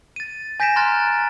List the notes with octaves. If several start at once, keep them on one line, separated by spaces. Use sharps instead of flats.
A6 D#7
G#5 G6 A#6 B6 D7 E7
A#5 C6 F6 F#6 A6 A#6